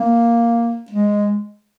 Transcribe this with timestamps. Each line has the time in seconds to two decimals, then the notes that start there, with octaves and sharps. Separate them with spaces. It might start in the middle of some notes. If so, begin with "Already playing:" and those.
Already playing: A#3
0.91 G#3